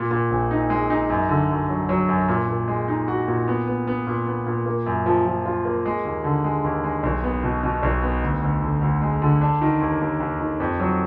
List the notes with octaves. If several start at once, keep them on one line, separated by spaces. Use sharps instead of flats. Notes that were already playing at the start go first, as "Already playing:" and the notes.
Already playing: A#2
A#2
A#1
D#4
G#3
D#4
F#2
D3
F#2
F#3
F#3
F#2
A#2
A#2
G#3
D#4
F#4
A#2
B3
B3
B3
A#2
B3
A#2
A#3
F#2
F3
F3
F4
A#3
G#3
D#2
D3
G#3
D#2
G#3
B1
B3
B2
B2
B1
B3
D2
D2
D3
D2
G#3
D3
D4
D#3
D#2
D#2
D#2
D#3
F2
F#3